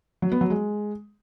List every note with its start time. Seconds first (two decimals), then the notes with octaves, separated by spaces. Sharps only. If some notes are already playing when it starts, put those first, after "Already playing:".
0.22 F#3
0.32 B3
0.41 F#3
0.50 G#3